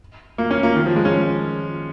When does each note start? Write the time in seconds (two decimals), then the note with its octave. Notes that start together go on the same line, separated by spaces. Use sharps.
0.38 A#3
0.51 C#4
0.63 A#3
0.76 D#3
0.86 F3
0.96 G#3
1.05 C#4